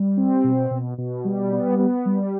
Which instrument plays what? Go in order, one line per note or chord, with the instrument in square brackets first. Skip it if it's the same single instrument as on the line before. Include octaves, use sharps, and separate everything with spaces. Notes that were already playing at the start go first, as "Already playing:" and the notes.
Already playing: [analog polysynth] G3
C4
B2
B2
B2
G3
B3
B3
G3